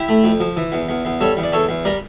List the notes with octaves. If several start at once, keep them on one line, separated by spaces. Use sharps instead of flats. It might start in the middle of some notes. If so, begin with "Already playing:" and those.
Already playing: E4 G4
A3
F2
F3
E3
E2
E2
E2
G3 A4 C#5
E2
D5
E2 A4 C#5
E2
G3 A#4 D5